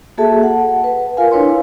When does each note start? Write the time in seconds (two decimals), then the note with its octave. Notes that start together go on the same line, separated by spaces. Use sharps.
0.18 A#3 F#4 G#4 A4 E5 A5
0.43 F#5
0.84 B4
1.17 F4 A#4 F5 G#5
1.32 D4 E4 B4 C#5 C6